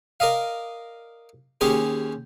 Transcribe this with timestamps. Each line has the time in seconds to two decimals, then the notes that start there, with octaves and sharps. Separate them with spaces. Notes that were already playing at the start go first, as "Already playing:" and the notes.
0.20 A#4 D5 D#5 F5
1.61 D#2 C#4 G4 G#4 C5